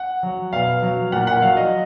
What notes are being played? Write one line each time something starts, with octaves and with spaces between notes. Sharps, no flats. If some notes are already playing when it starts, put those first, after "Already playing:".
Already playing: F#5
F#3
B2 F5
F#3
A#2 F#5
F#5
F#3 F5
D#5